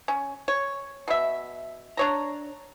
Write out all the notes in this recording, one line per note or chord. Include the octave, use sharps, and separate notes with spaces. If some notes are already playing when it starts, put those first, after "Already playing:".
C#4
C#5
B2 E5
D4 C#5 A#5